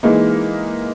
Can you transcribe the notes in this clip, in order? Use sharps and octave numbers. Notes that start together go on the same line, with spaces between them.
E3 G#3 A#3 D#4